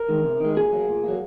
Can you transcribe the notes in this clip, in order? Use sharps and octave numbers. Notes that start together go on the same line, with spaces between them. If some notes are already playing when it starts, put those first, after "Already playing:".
Already playing: A#4
D#3 G#3
C3
D#3 G#3
A#2 G#4
F#3 A#3
A#2
F#3 A#3